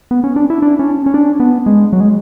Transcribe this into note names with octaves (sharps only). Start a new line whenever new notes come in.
B3
C#4
D4
E4
D4
C#4
C#4
D4
B3
G#3
F#3
G#3